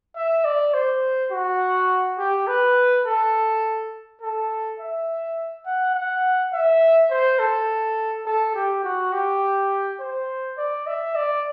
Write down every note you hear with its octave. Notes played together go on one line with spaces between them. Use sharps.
E5
D5
C5
F#4
G4
B4
A4
A4
E5
F#5
F#5
E5
C5
A4
A4
G4
F#4
G4
C5
D5
E5
D5